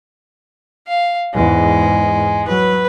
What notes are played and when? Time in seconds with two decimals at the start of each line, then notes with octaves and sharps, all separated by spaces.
0.87 F5
1.34 E2 G#2 G#3
2.47 F#3 B4